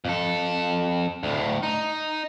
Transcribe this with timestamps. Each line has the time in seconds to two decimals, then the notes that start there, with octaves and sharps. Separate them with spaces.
0.05 F2 A4
1.23 D2 A2
1.63 D#4